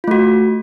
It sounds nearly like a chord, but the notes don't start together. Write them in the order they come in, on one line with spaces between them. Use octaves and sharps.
F4 A3 F#4